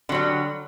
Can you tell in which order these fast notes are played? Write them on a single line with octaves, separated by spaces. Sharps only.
D3 F#3 G3